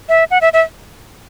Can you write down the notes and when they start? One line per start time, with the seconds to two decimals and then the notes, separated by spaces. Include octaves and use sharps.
0.09 E5
0.31 F#5
0.41 E5
0.53 E5